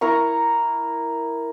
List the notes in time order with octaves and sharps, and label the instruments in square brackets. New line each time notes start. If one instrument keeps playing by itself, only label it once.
[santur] E4 A#4 A#5 C#6